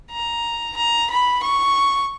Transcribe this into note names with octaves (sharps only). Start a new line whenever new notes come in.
A#5
A#5
B5
C#6